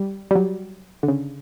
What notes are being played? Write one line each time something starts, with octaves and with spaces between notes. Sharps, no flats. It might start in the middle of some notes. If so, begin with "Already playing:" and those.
Already playing: G3
G3
F#3
D3
C#3